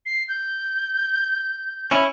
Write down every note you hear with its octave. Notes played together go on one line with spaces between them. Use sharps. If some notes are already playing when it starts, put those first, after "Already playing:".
C7
G6
C#4 E4